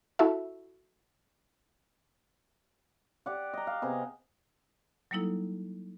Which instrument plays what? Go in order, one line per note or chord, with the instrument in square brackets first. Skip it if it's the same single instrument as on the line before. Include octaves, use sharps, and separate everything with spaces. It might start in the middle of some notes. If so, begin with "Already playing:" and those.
[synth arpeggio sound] E4 F#4 A4 E5
[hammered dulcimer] G4 D5 F#5
D#5 A#5
F5
C3 B3 G#4 D#5
[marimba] F#3 G3 A#3 D#4 E4 A4